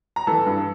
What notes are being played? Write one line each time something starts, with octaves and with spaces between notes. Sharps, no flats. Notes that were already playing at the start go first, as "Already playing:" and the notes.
A#5
E3 A4 A5
G2